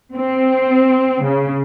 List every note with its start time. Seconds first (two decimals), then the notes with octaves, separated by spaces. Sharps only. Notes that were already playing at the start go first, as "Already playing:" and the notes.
0.14 C4
1.24 C#3